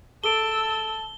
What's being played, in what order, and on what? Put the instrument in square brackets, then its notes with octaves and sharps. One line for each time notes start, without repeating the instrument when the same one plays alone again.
[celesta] G#4 A4 D7 [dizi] A5 [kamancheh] E6 [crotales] G7